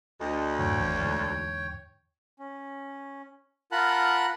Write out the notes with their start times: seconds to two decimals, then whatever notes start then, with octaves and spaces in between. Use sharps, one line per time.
0.20 D2 D#5
0.59 F#2 A2 D3 C#5 G5
0.80 G#1 E2
1.01 E2 G#2 D3
2.39 C#4
3.72 F4 A#4 F#5 A5 B5 F#6